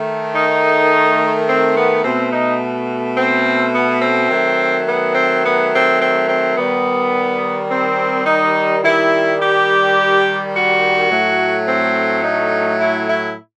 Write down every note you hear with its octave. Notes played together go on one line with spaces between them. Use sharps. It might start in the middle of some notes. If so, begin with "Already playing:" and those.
Already playing: D#3 A3
D#4
C4
B3
B2 A3 C4
D#4
C4
B3
C4
D#3 F#3 A3
B3
C4
B3
C4
C4
C4
D#3 G3 B3
C4
D#4
D#3 G3 E4
G4
F#4
A2 F#3 A3
C4
D#4
E4
E4